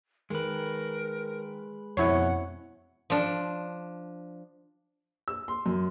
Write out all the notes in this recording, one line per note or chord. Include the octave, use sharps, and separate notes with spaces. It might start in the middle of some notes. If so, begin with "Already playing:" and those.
D#3 G#3 A#4 B4
F2 B2 C#4 E4 C#5 F#5
F3 D4
E6
C6
F#2